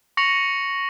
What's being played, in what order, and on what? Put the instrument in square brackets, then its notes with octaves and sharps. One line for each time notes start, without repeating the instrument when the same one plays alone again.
[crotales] C#6 A#6 C#7 F7 F#7